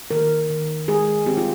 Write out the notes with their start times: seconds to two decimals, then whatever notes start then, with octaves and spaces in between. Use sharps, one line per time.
0.11 D#3 A#4
0.50 D#3
0.88 G#3 G#4
1.27 C4 G4
1.37 F4